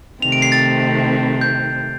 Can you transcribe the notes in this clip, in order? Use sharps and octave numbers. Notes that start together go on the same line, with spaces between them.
C3 D#3 A3 C4 F7
D7
C7
A6
G6